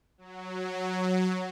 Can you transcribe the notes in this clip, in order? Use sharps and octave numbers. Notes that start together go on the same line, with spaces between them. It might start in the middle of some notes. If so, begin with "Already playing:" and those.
F#3